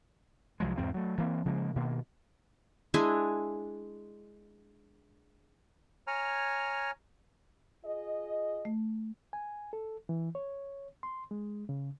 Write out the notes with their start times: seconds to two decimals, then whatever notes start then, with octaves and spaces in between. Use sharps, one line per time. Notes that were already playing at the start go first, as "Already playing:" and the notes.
0.60 C2 F3 F#3 G#3
0.78 E2 G#2 C4
0.94 F#3 A3
1.18 E3 A#3 C4
1.45 C#3 F3 G#3 A#3
1.76 B2 D#3 A#3
2.94 G#3 D4 E4 G#5
6.07 C#5 G#5 A#5 F6
7.84 F4 G#4 D#5
8.65 A3
9.33 G#5
9.73 A4
10.09 E3
10.35 C#5
11.03 C6
11.31 G#3
11.69 C#3